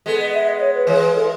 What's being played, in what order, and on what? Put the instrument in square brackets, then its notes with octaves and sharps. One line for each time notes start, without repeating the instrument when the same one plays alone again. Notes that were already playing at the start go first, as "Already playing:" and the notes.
[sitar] G#3 B3 [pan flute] A4
[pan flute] D#5
E5
D#5
C#5
B4
[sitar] E3 G#3 [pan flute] C#5
[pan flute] B4
A4